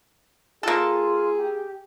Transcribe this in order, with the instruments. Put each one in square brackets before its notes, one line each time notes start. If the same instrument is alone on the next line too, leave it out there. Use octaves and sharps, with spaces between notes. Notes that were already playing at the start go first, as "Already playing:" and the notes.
[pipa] A#3 A4 [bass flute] F4 [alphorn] G#4
[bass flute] G4